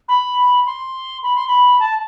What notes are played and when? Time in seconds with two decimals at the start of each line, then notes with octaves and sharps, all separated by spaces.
0.08 B5
0.66 C6
1.22 B5
1.35 C6
1.47 B5
1.79 A5